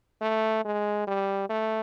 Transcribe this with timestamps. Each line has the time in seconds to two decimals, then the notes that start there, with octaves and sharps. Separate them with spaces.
0.21 A3
0.65 G#3
1.07 G3
1.50 A3